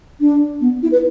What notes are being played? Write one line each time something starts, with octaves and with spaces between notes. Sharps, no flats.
D4
B3
E4
B4